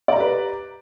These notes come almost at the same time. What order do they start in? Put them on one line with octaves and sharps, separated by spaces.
D5 A#5 G4 B4